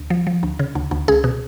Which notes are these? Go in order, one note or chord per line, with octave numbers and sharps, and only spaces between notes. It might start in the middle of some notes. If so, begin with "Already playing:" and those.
Already playing: D2
F3
F3
D2
C#3
D2
D2
C#2 G#4
B2